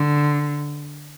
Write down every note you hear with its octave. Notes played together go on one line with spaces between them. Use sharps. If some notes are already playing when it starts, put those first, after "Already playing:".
Already playing: D3